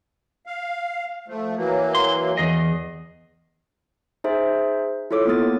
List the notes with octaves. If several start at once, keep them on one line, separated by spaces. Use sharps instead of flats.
F5
F3 A3
E3 F#3 A#3
C6
E2 G#4 D#5
D#4 G#4 C5 E5
E4 F4 A4 C#5 D6
A#3 B3 D#6 A6